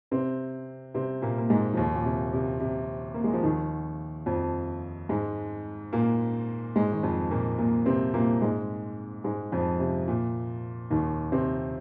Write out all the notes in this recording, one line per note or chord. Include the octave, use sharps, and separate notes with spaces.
C3 C4
C3 C4
A#2 A#3
A#3
G#2 G#3
F3
D#2 D#3
A#2
C3
C3
C3
A#3
G#3
F3
D#2 D#3
F2 F3
G#2 G#3
A#2 A#3
G#2 G#3
D#3
F2 F3
A#2 A#3
A#2 A#3
C3 C4
A#2 A#3
G#2 G#3
G#2 G#3
F2 F3
C3
A#2
D#2 D#3
C3 C4